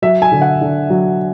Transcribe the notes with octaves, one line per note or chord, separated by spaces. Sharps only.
F#3 E5
G#5
D3
F#5
D3
F#3